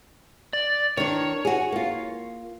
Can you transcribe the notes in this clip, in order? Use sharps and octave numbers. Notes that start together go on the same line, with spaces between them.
D5
D#3 D4 C#5
F#4 G#4
A#3 F4